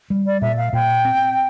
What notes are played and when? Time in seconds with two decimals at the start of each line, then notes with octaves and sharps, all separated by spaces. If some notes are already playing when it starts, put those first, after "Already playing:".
0.10 G3
0.26 D5
0.42 A#2 E5
0.57 F5
0.73 A#2 G5
1.05 C4